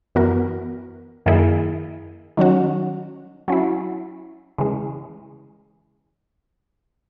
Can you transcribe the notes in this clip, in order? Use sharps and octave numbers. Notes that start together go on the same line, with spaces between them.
F#2 E3 B3 F#4 A#4
F#2 D#3 A#3 E4 G#4
D#3 F#3 C#4 F#4
F#3 C#4 E4
C#3 E3 G#3